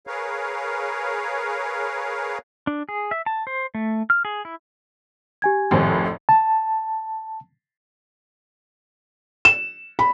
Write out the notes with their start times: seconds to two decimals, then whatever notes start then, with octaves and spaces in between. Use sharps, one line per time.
0.07 G#4 A#4 B4 C#5 F5
2.67 D4
2.89 G#4
3.11 E5
3.26 A5
3.47 C5
3.75 A3
4.10 F6
4.25 G#4
4.45 E4
5.42 G4 G#5 G#6
5.71 G#1 F2 A2
6.29 A5
9.45 E7
9.99 B5